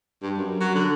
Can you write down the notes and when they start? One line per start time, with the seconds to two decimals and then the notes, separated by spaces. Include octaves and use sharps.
0.22 G2
0.37 F#2
0.60 F#3
0.75 D3